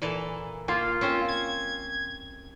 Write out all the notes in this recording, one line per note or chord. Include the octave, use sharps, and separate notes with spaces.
A#2 E3 A4
A#3 F4
C4 C#4 C5
G#6